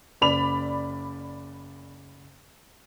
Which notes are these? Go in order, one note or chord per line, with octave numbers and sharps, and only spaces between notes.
F#1 D5 B5 F7